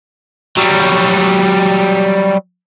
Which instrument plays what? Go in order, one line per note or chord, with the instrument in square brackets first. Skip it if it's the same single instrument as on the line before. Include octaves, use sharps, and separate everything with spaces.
[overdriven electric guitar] F#3 G3